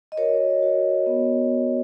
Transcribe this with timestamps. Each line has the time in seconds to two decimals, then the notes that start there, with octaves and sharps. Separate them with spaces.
0.12 D#5
0.17 F#4 A#4 C#5
0.62 F#4
1.06 B3